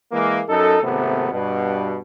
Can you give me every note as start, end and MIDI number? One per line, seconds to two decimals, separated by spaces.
0.12 0.41 52
0.12 0.41 56
0.12 0.41 58
0.48 0.77 42
0.48 0.77 63
0.48 0.77 69
0.82 1.29 32
0.82 1.29 48
0.82 1.29 57
0.82 1.29 59
1.32 1.97 43
1.32 1.97 47